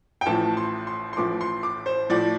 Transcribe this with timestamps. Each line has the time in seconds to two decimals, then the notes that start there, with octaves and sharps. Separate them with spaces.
0.21 G5
0.26 A1 A2 F3 A5
0.57 C6
0.87 C6
1.13 C6
1.17 A1 A2 F3 D6
1.41 C6
1.63 D6
1.86 C5
2.10 A2 F3 D5